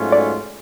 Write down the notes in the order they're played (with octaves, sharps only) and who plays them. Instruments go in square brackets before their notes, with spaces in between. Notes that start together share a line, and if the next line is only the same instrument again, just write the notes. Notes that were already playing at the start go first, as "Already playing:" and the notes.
Already playing: [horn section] G#2 F#3 A3 C#4 F4
[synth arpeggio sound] D5